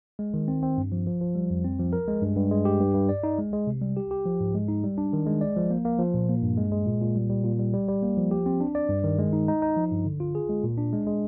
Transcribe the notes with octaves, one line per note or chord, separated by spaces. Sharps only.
G#3
D#3
C4
C4
G2
F3
F3
F3
G3
F2
C4
F3
A#4
G#3
G2
G2
G#3
G4
G2
G2
D5
D#4
G#3
G#3
C3
G3
G4
G4
F3
G#2
G#3
D#4
G3
D4
D#3
G#3
D5
F3
A#3
A#3
F3
A#2
A#3
G2
G#3
G#3
A#2
A#2
G3
G3
A#2
G3
G3
G3
A#3
F3
G4
C4
D4
D5
G2
D#3
G#3
D#4
D#4
D#4
F3
G2
D3
F4
G#4
G#3
A#2
D4
G#3
G#3